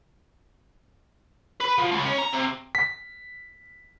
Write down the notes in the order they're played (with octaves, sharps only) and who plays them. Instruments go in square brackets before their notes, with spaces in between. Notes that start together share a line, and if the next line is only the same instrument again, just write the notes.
[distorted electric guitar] B4
F3
C#2
C#4
A#5
C3
[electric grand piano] B6